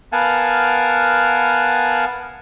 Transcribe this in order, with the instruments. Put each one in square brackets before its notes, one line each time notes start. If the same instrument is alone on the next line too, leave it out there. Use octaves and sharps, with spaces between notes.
[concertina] B3 A#4 F5 F#5 G#5 A5